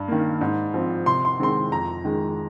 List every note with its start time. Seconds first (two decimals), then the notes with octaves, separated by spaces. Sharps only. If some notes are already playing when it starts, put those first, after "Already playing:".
Already playing: G2
0.08 D#3 A#3
0.41 G#2
0.74 F3 C4
1.06 C3 C6
1.25 C6
1.39 D#3 G#3 C4 C6
1.72 F2 A#5
2.05 D#3 G#3